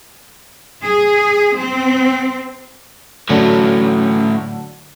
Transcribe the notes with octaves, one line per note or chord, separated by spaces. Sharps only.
G#4
C4
A2 D3 F#3 A3 C#4